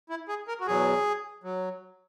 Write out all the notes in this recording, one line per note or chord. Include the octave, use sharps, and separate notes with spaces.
E4
G#4
A#4
F#4
E2 B2 F#3 G#4
F#3